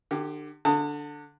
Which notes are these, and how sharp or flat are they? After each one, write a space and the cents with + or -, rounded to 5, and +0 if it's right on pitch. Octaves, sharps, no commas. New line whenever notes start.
D3 +40 G4 +0
D3 +0 A5 +40 D#6 +0